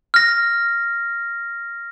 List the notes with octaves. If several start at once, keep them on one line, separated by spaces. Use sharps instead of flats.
F6 A#6